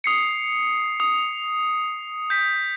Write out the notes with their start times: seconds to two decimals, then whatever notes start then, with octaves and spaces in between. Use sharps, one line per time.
0.04 D#6 C7 C#7
1.00 D#6
2.30 G6 B6